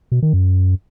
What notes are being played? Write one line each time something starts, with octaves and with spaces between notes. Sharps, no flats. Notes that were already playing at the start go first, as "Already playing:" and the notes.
B2
D#3
F#2